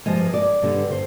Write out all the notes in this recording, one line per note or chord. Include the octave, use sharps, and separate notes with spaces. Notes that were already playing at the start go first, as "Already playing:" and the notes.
G2 F3 G#3 D#5
D5
G2 D3 G3
C5